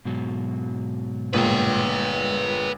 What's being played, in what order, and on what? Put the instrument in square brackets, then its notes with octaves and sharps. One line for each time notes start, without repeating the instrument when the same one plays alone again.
[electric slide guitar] G#2 B2 F#3
[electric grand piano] G1 A#2 G#3 [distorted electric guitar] B4 G5